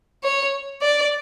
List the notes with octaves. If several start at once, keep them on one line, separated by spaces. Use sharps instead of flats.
C#5
D5